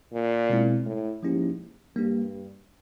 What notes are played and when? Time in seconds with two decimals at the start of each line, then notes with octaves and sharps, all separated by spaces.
0.13 A#2
0.50 B2 G#3 C4 E4
0.86 A2
1.23 G#2 F3 A#3 C#4 E4 G4
1.96 G2 G3 A#3 D4 G4